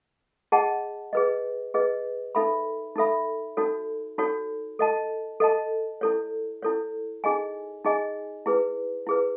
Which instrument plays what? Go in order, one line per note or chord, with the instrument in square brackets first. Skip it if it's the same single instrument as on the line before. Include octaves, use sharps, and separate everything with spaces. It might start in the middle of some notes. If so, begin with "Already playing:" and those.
[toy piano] G#4 D#5 F#5 A5
G#4 B4 D#5
G#4 B4 D#5
D#4 A4 E5 B5
D#4 A4 E5 B5
D#4 F#4 A4 C#5
D#4 F#4 A4 C#5
A4 D#5 A5
A4 D#5 A5
E4 A4 C#5
E4 A4 C#5
D#4 G#4 D#5 G#5
D#4 G#4 D#5 G#5
E4 G#4 B4
E4 G#4 B4